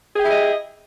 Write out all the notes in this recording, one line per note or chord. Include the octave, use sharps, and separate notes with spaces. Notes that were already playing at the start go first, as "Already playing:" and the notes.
E4 G4 G#4 D#5